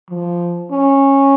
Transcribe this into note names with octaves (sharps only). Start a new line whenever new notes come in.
F3
C#4